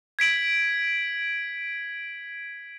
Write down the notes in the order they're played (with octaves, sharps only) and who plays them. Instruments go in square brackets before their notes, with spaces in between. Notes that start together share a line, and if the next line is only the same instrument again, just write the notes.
[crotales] G#6 B6 D7 F#7